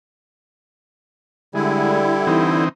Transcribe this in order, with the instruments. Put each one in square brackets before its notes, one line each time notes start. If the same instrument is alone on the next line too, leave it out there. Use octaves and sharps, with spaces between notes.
[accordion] D3 E4 [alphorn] G3 [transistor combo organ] G#3
[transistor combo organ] E3 C4 D#4